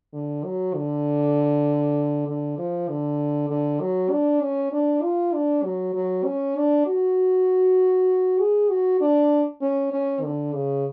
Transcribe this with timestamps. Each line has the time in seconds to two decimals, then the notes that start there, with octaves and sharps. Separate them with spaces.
0.13 D3
0.44 F#3
0.75 D3
2.27 D3
2.58 F3
2.89 D3
3.50 D3
3.81 F#3
4.11 D4
4.42 C#4
4.72 D4
5.03 F4
5.33 D4
5.64 F#3
5.94 F#3
6.25 C#4
6.56 D4
6.87 F#4
8.39 G#4
8.70 F#4
9.01 D4
9.62 C#4
9.92 C#4
10.23 D3
10.53 C#3